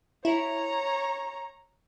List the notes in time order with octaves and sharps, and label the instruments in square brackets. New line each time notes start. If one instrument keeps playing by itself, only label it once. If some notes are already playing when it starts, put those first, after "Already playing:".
[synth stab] E4 [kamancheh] C#5 A#5